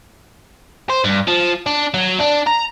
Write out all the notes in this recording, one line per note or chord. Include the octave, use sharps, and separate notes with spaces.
C5
G2
F3
D4
F#3
D4
A#5